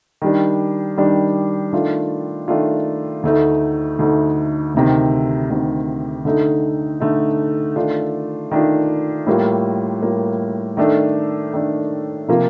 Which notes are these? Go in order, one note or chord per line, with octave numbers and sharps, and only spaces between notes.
D#3 G3 D4
D#3 G3 D4
D#3 A3 D4 F4
D#3 A3 D4 F4
D2 D3 A3 D#4
D2 D3 A3 D#4
D2 C3 D#3
D2 C3 D#3
D3 A3 D#4
D3 A3 D#4
D#3 A3 D4 F4
D#3 A3 D4 F4
A2 G3 A#3 F4
A2 G3 A#3 F4
D#3 A3 D4 A4
D#3 A3 D4 A4
C3 F3 A#3 F4